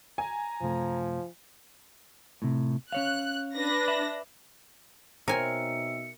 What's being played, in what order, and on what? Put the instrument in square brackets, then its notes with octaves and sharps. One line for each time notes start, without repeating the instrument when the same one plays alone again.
[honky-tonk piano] G#5 [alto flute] A#5
[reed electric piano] F#2 C3 A3 [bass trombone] F3
[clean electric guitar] A2 C3
[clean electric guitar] C#4 C#5 F5 [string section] F#6
[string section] D4 B4 A#6
[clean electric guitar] E5 B5
[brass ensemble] B2 D#4 E5 [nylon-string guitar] C4 C#5 [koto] A#4 G#5 [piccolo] C#7